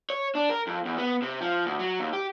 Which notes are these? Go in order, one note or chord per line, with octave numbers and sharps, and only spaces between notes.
C#5
D4
A#4
F2
E2
B3
C3
F3
D2
F#3
D#2
G4